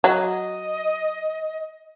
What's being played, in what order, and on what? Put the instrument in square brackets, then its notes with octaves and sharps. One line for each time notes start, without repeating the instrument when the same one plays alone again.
[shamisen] F#3 [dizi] D#5